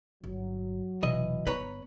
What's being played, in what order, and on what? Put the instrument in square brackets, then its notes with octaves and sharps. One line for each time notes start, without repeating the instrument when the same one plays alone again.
[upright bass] G1 [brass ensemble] F#3
[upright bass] F1 B2 [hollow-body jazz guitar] E3 D#5
[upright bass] G1 B3 [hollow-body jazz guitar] B4 C#5 A#5